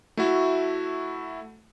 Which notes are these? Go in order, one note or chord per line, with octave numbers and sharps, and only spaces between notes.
A3 E4 F#4